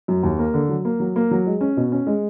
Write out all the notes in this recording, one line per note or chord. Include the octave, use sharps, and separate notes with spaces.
F#2
D#2
A#3
D3
F#3
A#3
F#3
A#3
F#3
G#3
C#4
B2
C#4
G#3